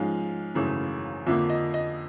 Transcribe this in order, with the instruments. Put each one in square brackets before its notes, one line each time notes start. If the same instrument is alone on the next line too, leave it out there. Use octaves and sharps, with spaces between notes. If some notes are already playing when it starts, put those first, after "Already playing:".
Already playing: [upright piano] G#2 F3 G#3 C#4 F5
G#1 F#2 C#3 E3 A3
F2 D3 F3 A#3 E5
D#5
D#5